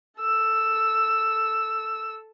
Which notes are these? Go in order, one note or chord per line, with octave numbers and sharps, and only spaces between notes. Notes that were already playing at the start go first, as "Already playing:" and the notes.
A4 E6